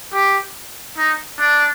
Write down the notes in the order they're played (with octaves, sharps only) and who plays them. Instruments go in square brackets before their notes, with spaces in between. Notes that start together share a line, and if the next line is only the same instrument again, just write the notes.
[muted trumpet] G4
D#4
D4